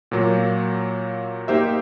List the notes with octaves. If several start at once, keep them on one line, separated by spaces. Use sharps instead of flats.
A#2 F#3 A#3
A#3 D#4 G4 C5 E5